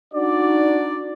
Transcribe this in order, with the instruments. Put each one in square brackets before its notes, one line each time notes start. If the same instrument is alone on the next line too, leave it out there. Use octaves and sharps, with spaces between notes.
[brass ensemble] D4 F#4 D5 [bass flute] D#4